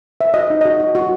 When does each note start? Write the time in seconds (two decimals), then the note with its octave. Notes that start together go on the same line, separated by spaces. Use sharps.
0.21 C5 E5
0.34 F#4 D#5
0.50 D#4
0.61 F#4 D#5
0.80 F#4
0.95 F#4